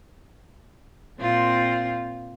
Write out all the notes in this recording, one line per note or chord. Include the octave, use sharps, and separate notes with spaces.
A#2 C4 F4